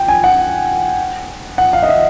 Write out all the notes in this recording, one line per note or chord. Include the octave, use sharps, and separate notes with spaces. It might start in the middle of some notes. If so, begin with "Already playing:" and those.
Already playing: G5
G#5
F#5
F#5
F5
D#5
E5